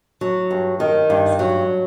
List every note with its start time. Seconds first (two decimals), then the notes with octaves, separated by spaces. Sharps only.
0.21 F#3
0.50 G2
0.80 D#3
1.10 G2
1.39 F#3